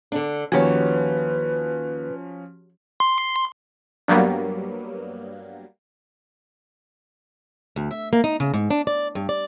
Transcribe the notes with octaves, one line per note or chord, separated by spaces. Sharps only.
D3 D4
D#2 F3 C#4 F#4 G4 B4 C#5 G#5
C6
G2 F#3 G3 A#3 B3
D2
E5
A#3
D#4
C#3
G#2
D4
D5
G2
D5